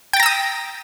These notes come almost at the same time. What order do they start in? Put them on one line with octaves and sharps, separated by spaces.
G5 A6 A#5 E6 D#6